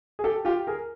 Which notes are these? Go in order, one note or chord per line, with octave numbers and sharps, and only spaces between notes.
G#4
G4 A4
F4 G4
G#4 A#4